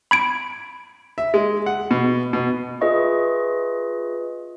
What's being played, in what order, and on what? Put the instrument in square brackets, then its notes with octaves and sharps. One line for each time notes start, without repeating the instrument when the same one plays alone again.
[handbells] B5 G#6 D7
[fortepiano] E5
G#3
F#5
B2
B2
[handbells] F4 G#4 B4 D#5 E5 C#6